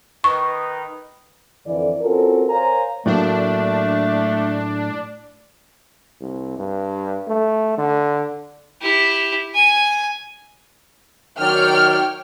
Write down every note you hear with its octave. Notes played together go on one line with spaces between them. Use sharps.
D#3 D#4 B4 C#6
F2 D3 E3 D5
C4 C#4 F4 F#4 A4 A#4
A#4 C5 C#5 F5 G#5 A#5
A2 F#3 A3 A#3 D4
C2
G2
A3
D3
E4 G4
G#5
D#3 F#3 C#5 D5 G5 F6